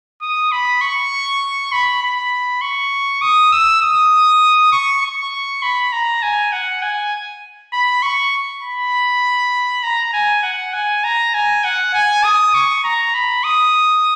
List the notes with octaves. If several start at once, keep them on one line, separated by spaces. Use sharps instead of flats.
D#6
B5
C#6
B5
B5
C#6
D#6
E6
D#6
C#6
C#6
B5
A#5
G#5
F#5
G#5
B5
C#6
B5
A#5
G#5
F#5
G#5
A#5
G#5
F#5
G#5
D#6
C#6
A#5
B5
D#6